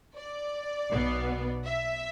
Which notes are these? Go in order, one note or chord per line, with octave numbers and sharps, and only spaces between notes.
D5
B1 B2 B3
E5